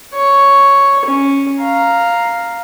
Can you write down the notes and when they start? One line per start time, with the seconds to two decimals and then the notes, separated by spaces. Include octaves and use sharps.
0.15 C#5
1.05 C#4
1.60 F5 A#5